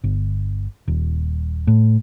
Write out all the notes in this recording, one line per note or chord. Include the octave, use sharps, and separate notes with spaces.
G1
D#1
A2